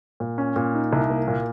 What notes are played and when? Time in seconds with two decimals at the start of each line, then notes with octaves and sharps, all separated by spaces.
0.20 A#2
0.38 C#4
0.56 A#2
0.74 D#4
0.93 C2
1.10 A#3
1.28 A#2